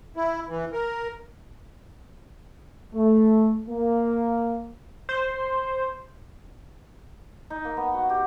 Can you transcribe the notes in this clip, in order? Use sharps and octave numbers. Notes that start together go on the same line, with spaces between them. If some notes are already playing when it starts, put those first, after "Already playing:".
E4
E3
A#4
A3
A#3
C5
D#4
A#3
B3
F#4
G4